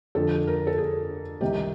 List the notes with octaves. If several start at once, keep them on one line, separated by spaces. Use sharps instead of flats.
F2 D3 F3 A4
A#4
A4
G#4
C2 C3 D#3 G4